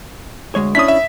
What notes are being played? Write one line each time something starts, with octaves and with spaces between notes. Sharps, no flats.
D2 G#3 C#5
C#4 D4 E4 D#6 B6
E5